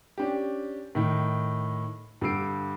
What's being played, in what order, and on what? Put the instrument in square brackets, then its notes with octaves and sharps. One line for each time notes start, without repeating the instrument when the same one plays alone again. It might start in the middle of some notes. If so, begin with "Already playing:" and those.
[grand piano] C#4 D4 G4
A2 D#3
G2 D3 G3 E6 C7 D7